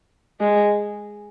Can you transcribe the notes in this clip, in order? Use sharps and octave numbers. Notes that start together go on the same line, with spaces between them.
G#3